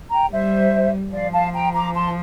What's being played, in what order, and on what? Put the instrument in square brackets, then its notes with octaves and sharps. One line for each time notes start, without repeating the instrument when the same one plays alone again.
[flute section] G5 A#5
[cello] G3 [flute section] C5 E5
[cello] F3 [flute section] D5 F5
[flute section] F5 A5
G5 A#5
A#5 D6
A5 C6